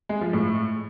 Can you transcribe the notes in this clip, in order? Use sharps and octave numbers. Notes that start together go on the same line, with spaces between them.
G#3
F3
A2